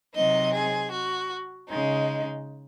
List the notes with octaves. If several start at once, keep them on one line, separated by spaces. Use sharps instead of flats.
C3 F#3 C4 D#4 D#5
G#4
F#4
C#3 G#3 D#4